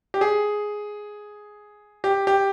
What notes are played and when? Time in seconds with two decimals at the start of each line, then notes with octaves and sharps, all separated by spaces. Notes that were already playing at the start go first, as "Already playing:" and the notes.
0.14 G4
0.21 G#4
2.04 G4
2.27 G4